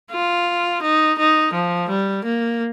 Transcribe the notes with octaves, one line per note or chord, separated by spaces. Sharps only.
F4
D#4
D#4
F3
G3
A#3